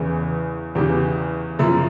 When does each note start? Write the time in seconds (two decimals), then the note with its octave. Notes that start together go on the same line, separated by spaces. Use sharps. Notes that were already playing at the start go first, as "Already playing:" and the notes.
Already playing: E2 C#3 E3
0.75 E2 C#3 E3 G4
1.59 F#2 C#3 F3 E4